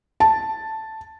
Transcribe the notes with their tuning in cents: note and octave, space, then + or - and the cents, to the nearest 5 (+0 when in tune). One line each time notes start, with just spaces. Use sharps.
A5 +0